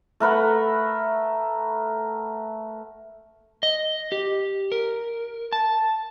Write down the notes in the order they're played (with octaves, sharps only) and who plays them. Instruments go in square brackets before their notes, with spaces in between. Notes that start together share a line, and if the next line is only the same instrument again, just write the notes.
[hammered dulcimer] A3 A#4 B4 F#5
[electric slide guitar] D#5
G4
A#4
A5